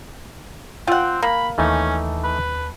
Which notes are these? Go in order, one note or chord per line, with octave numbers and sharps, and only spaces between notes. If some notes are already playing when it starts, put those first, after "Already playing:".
C4 F4 F#5 G5
A#3 B5
D#2 E3 A3 C#4 D#4 A5
B4